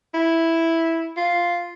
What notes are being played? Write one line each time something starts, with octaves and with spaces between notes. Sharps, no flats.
E4
F4